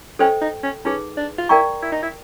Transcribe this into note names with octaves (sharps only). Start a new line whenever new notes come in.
C#4 A4 C5 D#5 G5
D#4
C#4
C#4 D#4 G#4 B4
D4
F4
E4 A#4 D5 G5 A#5 C#6
E4
D#4
E4